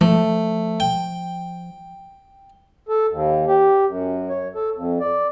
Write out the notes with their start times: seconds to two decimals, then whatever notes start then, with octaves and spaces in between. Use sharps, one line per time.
0.01 F3 A3
0.80 G5
2.89 A4
3.09 D#2
3.47 G4
3.86 F#2
4.30 C#5
4.55 A4
4.75 F2
5.00 D5